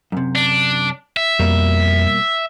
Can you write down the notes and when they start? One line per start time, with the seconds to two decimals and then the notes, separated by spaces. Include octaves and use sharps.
0.12 F#2 C3
0.35 D4
1.17 E5
1.39 F2 B2 G3 A#3